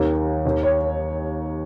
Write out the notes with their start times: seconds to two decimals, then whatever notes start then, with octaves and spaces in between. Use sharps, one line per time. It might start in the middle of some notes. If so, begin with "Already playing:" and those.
Already playing: D#2 D#3 G4 A#4
0.45 D#2 D#3
0.63 C#5